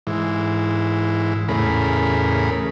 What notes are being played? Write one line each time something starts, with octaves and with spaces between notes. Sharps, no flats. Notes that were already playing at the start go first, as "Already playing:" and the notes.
G#2 E3
E2 A2 C#3 G#4 A#4 B5